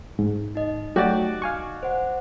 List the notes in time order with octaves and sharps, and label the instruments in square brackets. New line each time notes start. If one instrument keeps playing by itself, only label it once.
[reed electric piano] G#2
[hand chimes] D#4 D#5
[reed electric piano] F#3 A3 G4 [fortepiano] F#4 D5
[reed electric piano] F5 G#5 C#6
[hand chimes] C5 F#5